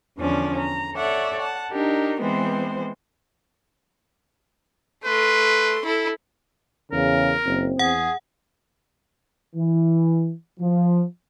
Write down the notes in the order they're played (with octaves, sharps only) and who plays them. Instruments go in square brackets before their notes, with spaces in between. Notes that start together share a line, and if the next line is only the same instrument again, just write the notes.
[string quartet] E2 D3 F3 C#4 D5
A#5
A4 C#5 D5 E5 F#5
F#5 A5
D4 D#4 G4 A#4
E3 G#3 B3 C4 C5
[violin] A3 C6 [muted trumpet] B4
[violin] E4 A4
[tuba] E2 [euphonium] C#3 [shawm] A#4
[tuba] F#1 [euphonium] C4
[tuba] E2 [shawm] G#4 [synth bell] F#5
[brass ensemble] E3
F3